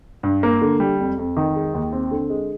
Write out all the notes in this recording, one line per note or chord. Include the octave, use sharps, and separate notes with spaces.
G2
A#3
D3
G3
F2
F2
D#3
G#3
D#2
C4
D3
G#3